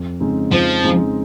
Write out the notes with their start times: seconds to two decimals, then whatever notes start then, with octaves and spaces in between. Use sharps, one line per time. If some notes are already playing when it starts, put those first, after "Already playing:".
Already playing: F2
0.20 C#3 G#3 C4 D#4
0.51 F2 F3
0.83 C#3 G#3 C4 D#4